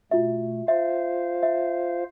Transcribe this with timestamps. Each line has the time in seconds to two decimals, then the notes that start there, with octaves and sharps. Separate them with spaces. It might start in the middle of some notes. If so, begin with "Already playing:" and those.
0.11 B2 A3 F4 F#4 E5
0.68 F4 C5 E5 F5
1.43 E5